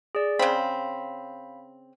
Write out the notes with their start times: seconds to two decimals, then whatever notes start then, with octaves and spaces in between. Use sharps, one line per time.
0.15 G#4 D5
0.39 C#3 C4 F5 B5 B6